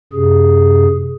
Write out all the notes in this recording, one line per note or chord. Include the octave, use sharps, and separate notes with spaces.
F#2 C3 G#4